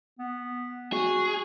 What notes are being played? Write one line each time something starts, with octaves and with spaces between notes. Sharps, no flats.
B3
F#4 G#4